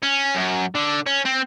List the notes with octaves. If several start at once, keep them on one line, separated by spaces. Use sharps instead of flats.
C#4
F#2
D3
C#4
C4